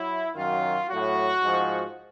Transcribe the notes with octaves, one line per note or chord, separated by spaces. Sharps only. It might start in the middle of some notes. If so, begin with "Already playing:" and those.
Already playing: F#3 E4
F#2 D#3 F#3 F4
A2 F#3 F#4
G#2 F3